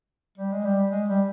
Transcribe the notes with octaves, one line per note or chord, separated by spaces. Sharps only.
G3
G#3
G3
G#3
G3